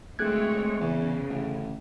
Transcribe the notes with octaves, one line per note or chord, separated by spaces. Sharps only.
D1 G#3 A3 C4 G#4 C#5 F#6 G#6
E2 C#3 E3
A1 D3